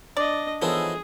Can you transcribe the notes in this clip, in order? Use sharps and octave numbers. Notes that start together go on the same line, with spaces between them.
D4 D5 D#5
E3 F3 B3 D#4 G#4 A4 C#5